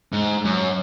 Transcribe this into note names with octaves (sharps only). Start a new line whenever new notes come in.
G#2
F#2